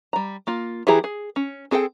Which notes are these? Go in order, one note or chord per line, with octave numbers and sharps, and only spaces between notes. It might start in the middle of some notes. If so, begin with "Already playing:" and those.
G3 A#5
A#3 F4
E3 E4 G4 G#4 A#5
G#4
C#4
C4 G#4 A4 C5 G5